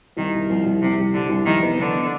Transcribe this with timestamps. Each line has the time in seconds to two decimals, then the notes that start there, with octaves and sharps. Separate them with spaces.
0.17 C2 D#3
0.33 C2
0.49 C2 F3
0.66 C2
0.81 C2 C3
0.98 G3
1.14 D3 G3
1.29 C2
1.46 F2 D#3
1.63 B3
1.78 D3 B3